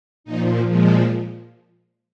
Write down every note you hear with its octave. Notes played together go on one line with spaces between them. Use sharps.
A#2 F3 D#4
A#2 F3 G#3